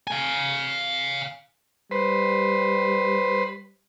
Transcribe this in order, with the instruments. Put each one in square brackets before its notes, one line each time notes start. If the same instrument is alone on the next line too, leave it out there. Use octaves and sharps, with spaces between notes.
[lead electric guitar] F5 G#5
[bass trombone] G3 [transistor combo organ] B4 C5